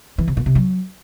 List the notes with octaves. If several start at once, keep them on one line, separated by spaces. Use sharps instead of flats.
E3
C3
A#2
C3
F#3